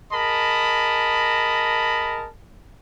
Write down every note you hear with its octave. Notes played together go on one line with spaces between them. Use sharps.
G#4 A#4 D#5 A5 B5